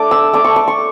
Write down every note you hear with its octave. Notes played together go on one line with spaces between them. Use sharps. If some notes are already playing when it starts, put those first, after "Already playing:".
Already playing: A3 D4 D6
E6
A3 D4 D6
C#6
D6
C#6